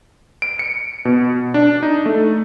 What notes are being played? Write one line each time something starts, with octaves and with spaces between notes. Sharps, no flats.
D7
C#7
B2
D4
D#4
A3